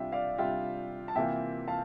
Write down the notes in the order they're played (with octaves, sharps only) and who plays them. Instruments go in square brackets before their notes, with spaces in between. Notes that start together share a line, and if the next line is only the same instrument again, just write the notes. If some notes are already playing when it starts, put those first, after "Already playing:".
Already playing: [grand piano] C3 G3 D4 F4 [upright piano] E5 G5
[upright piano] D5 F5
[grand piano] C3 G3 D4 F4 [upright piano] E5 G5
[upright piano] A5
[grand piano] C3 E3 A#3 F4 [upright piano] E5 G5
[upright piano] F5 A5